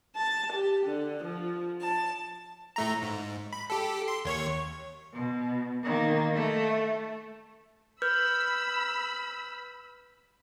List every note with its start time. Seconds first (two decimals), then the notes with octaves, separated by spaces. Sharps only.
0.15 A5
0.52 G4
0.86 D3
1.23 F3
1.81 A5
2.76 A2 A3 A#5
3.02 G#2
3.53 B5
3.70 G4 A4
4.08 C6
4.25 D#2 C#5 C#6
5.14 B2
5.84 D#3 A#3
6.34 A3
8.02 B4 B5 E6 F6 G6